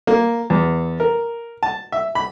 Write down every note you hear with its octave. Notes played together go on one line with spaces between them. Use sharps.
A#3
E2
A#4
A5
E5
B5